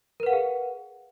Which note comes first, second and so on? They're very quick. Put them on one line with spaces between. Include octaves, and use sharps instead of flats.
A#4 B4 F#5 F5 G#4